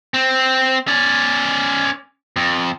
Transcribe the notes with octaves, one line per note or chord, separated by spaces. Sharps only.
C4
C#4 D5
F2